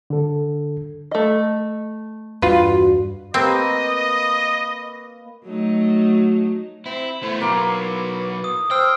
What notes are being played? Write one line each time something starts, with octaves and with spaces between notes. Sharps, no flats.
D3 A4
A3 D#5
E2 G2 D4 F4 F#4 B4
A#3 C4 B4 D#5
F#3 A3 D#4
C4 E4
A3 B3 E4 C5
B2 F#3 A#3 B3 C6 D6
D#6
C5 G5 E6 F6